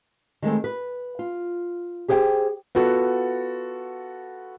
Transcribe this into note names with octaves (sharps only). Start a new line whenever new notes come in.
D#3 G#3 A3 C4
B4
F4
G4 G#4 C5 D5 G5
B3 F4 F#4 A4